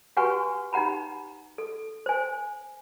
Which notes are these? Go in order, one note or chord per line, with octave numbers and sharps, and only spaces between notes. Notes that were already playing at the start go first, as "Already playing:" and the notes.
F#4 G4 B4 F#5 G#5 C#6
D#4 G4 F#5 A#5 B5
A4
C5 G#5